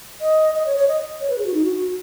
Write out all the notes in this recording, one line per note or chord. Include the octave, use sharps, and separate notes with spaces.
D#5
D#5
C#5
C#5
D#5
C#5
B4
G#4
F#4
D#4
F#4
F#4